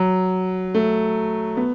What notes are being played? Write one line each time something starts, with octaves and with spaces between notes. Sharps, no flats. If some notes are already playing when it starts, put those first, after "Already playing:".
Already playing: F#3
A3
B3